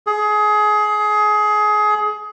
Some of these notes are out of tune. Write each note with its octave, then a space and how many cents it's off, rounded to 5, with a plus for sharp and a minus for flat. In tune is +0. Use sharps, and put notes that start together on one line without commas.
G#4 +25